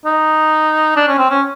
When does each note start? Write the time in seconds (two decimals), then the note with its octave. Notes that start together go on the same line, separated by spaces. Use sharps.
0.06 D#4
0.96 D4
1.08 C#4
1.18 C4
1.30 C#4